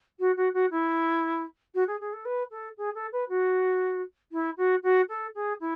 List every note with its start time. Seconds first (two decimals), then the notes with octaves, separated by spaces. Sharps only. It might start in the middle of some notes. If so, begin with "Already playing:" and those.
0.19 F#4
0.37 F#4
0.54 F#4
0.71 E4
1.75 F#4
1.87 G#4
2.00 G#4
2.13 A4
2.25 B4
2.51 A4
2.78 G#4
2.95 A4
3.12 B4
3.29 F#4
4.32 E4
4.57 F#4
4.83 F#4
5.09 A4
5.35 G#4
5.60 E4